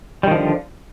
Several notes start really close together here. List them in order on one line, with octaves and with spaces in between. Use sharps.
G3 D#3 F3 D3